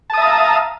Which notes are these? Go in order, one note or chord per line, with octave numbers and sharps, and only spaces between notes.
E5 F5 A5 A#5 D#6